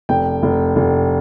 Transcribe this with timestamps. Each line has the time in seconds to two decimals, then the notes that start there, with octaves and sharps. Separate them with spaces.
0.09 F1 G5
0.43 F1
0.76 F1